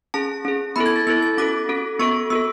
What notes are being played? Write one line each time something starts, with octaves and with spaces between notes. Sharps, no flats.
C#4 G#4 A5
C#4 G#4
B3 E4 A4 B5
G#6
A6
B3 E4 A4 A6
A6
C#4 F#4 A4 D6
C#4 F#4 A4
B3 F#4 A4 C#6
B3 F#4 A4 E6